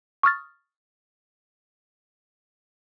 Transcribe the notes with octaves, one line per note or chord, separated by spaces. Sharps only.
C#6 D#6 F6 A6